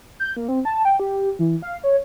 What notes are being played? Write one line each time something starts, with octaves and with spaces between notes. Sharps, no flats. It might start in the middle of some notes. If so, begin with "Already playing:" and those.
G6
A#3
C4
A5
G5
G4
E3
F5
C#5